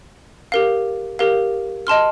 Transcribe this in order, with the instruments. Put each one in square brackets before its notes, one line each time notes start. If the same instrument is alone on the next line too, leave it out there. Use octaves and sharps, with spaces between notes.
[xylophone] G4 A#4 F5
G4 A#4 F5
D#5 A5 C6 F6